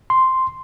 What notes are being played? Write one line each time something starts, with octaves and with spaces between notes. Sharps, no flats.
C6